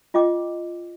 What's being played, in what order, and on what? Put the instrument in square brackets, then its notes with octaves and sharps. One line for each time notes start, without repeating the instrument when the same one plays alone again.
[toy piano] F4 D#5 G5 D6